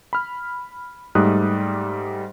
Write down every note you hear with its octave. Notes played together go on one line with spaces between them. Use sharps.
B5 F6
G#2 G3 A3 D#6 F#6